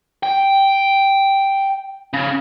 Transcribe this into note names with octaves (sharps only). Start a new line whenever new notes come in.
G5
C#3